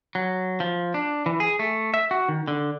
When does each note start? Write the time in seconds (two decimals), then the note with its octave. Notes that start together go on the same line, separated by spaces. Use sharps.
0.15 F#3
0.60 F3
0.94 D4
1.26 E3
1.40 G#4
1.59 A3
1.94 E5
2.11 F#4
2.28 D#3
2.48 D3